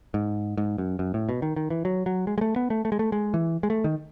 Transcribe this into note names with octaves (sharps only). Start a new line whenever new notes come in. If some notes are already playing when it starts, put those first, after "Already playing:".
G#2
G#2
F#2
F#2
A2
B2
D#3
D#3
E3
F#3
F#3
G#3
G#3
A3
B3
A3
A3
G#3
A3
G#3
E3
G#3
A3
D#3